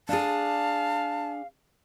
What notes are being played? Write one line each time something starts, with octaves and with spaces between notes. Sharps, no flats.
D4 G#4 F5 A5